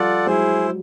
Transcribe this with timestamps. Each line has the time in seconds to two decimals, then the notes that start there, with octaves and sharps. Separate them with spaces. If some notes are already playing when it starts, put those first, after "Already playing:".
Already playing: F3 G3 F4 A4 D5 F#5
0.26 F#3 G#3 E4 G#4 C5